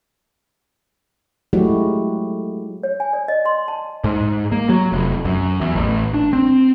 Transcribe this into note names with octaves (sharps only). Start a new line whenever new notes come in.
F#3 G#3 A3 E4 F#4 G4
C#5
G#5
D5
D#5
C6
A5
G#2
A#3
F#3
F1
F#2
E2
A1
D4
C4